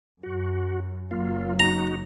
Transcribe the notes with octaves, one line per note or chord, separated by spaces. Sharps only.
F#2 F#4
F#1 F#3 A#3 F4
D#4 F#4 A#5